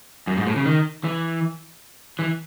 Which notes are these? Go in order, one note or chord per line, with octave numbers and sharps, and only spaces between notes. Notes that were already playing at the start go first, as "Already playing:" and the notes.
F#2
G#2
A2
C#3
D#3
E3
E3